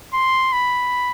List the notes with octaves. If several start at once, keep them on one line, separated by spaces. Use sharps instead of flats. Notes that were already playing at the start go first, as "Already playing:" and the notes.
C6
B5